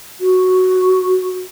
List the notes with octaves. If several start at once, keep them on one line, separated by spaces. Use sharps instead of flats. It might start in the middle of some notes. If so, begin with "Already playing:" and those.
F#4